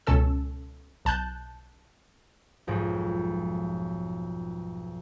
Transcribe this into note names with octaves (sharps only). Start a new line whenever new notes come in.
C#2 B2 C#4 A4 E6
B1 A5 F#6 G6
B1 F2 G#2